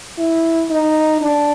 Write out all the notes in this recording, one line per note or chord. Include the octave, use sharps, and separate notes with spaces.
E4
D#4
D4